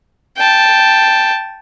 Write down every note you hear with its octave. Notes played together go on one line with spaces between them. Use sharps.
G5 A5